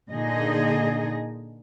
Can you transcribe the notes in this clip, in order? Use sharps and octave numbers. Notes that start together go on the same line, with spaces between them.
A#2 D3 D#4 G#4 D#5